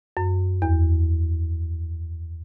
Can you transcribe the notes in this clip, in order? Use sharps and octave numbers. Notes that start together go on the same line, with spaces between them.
F#2
E2